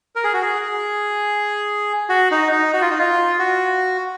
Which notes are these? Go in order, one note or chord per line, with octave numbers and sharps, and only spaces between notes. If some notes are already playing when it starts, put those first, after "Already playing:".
A#4
G#4
F#4
G#4
F#4
D#4
D#4
F#4
F4
D#4
F4
F#4